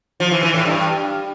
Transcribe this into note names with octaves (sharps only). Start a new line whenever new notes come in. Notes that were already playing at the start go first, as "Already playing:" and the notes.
F3
E3
E3
A2
G2